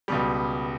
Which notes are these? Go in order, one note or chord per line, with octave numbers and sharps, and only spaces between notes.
C#2 B2 G3